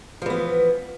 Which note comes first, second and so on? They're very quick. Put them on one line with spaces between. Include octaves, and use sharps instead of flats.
F3 E3 B3